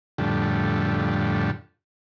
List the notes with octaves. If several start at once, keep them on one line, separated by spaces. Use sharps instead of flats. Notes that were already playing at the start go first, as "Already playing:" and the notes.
F2 A2 D3 G3